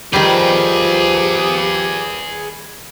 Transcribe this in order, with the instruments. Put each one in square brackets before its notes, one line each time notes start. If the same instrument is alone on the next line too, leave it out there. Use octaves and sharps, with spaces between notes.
[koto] D#3 G3 [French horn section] F3 [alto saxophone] G4 [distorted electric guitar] G#4 B4